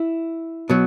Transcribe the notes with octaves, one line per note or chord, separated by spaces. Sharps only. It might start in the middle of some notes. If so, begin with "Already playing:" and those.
Already playing: E4
B2 F#3